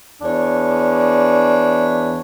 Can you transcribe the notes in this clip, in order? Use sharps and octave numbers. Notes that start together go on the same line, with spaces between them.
E2 D4 C#5